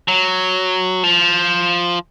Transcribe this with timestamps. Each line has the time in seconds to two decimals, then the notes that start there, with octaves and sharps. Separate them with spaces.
0.08 F#3
1.04 F3